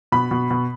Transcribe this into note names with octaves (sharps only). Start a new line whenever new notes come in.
B2 B5
B2
B2